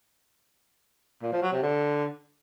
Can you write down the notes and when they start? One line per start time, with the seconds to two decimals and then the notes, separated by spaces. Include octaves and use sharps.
1.23 A#2
1.33 F3
1.43 F#3
1.53 C3
1.63 D3